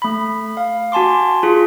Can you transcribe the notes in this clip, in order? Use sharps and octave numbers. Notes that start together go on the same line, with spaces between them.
A3 B5
F5
F#4 G#5 A5 C6 D6
F4 G#4